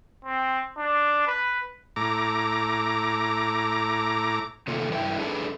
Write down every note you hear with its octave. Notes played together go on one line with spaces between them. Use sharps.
C4
D4
B4
A2 A#5 D6
C3 D#3 A3 A#3 F4 A4
G2 E4 A#4 B4 E5 G5
D4 G#4 A4 B4 C#5 D5